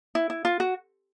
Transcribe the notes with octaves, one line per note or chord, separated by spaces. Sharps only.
E4
E4
F4
F#4